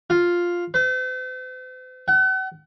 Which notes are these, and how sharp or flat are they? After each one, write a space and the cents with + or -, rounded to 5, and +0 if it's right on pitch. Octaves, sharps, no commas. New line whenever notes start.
F4 +5
C5 -45
F#5 +40